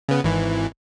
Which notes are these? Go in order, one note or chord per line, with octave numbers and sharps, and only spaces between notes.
C#3 B3
G#1 E3